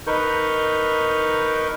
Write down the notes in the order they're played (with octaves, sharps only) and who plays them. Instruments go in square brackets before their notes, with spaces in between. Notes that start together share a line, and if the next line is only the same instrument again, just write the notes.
[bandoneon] D#4 A#4 B4 C#6 G6